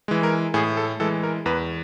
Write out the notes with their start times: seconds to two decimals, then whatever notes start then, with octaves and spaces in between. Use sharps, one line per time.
0.08 E3 G#3
0.23 A#4
0.54 A2 G#4
0.77 A4
1.00 E3 G#3 A4
1.23 A#4
1.46 E2 B4